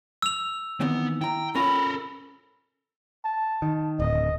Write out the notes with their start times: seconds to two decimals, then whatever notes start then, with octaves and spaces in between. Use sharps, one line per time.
0.22 E6 F7
0.80 D#3 E3 B3 C4
1.21 E4 G5 A#5
1.55 C#4 F4 A4 A#4 B5
3.25 A5
3.62 D#3
3.99 D1 D#5